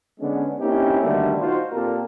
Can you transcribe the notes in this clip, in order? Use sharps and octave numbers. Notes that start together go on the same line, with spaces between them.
D3 G#3 B3 C#4 D4
A#3 C4 C#4 D#4 E4 G4
B2 D3 D#3 G3 A3
D#4 F4 F#4 C5
A#2 A#3 C4 G4 A4 A#4